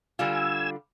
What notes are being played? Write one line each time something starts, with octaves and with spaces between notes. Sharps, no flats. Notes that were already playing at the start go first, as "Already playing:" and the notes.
D3 G3 F4 G#5 E6